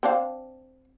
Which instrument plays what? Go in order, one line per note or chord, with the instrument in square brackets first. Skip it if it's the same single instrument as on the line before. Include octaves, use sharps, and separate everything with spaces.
[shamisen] C4 D4 F5